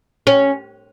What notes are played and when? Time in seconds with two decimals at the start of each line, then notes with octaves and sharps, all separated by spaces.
0.27 C#4